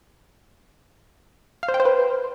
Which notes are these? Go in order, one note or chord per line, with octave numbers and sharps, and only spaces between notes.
F5
C5
G5
C5
B4